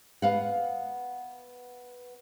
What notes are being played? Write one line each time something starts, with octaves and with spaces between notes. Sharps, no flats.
B3 F5 F#5